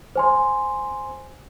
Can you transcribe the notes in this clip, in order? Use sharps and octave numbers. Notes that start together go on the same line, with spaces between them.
C5 G#5 C6